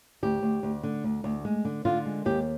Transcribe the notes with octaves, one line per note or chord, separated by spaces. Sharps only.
D2 G4
D2
D2
D3
D2
D2
G#3
D3
D3 F4
G#3
D#2 G4